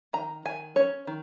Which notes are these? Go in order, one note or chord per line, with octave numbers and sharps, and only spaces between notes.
D#3 A#5
D#3 G#5
C#4 C#5
D#3